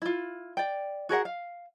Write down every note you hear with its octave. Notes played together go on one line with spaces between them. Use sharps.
E4 F4
D5 G5
F#4 G#4 A#4 F#5
F5